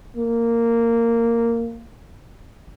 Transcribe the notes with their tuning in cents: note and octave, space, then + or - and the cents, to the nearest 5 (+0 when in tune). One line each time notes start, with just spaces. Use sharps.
A#3 -10